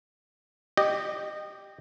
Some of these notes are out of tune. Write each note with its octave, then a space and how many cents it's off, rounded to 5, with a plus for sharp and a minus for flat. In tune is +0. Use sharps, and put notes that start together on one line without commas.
G4 +0 D#5 -25